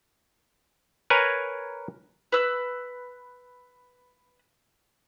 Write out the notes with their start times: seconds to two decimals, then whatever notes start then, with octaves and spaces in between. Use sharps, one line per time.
1.10 A#4 B4 C#5 G#5 A#5
2.32 B4 E6